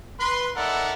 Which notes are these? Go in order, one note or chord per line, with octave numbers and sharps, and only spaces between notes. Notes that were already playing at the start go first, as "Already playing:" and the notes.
B4 C6
D#4 A4 A#4 D5 E5 F#5